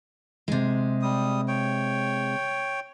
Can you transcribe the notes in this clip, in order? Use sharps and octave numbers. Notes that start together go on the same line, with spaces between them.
C3 G#3
G3 D#6
C#5 G5